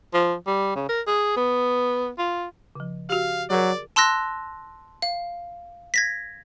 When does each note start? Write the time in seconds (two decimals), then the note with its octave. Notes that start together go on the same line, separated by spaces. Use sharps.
0.14 F3
0.47 G3
0.75 C#3
0.89 A#4
1.07 G#4
1.36 B3
2.18 F4
2.75 C#3 F3
3.10 F#4 G4 F5
3.50 F#3 G#4 A#4 D5
3.96 A5 C6 E6 F#6 A#6
5.02 F5
5.94 G#6 A#6 B6